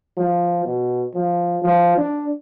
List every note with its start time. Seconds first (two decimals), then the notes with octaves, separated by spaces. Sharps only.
0.17 F3
0.65 B2
1.15 F3
1.62 F3
1.98 D4